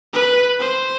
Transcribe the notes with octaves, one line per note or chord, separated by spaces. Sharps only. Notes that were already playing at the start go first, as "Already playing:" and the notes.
B4
C5